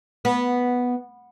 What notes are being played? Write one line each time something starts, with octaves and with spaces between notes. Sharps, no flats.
B3